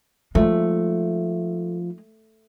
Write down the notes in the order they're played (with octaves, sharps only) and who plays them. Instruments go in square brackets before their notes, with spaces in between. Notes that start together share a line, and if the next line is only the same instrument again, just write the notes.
[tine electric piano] F3 F4 [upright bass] G#3 D#4 [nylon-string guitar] A3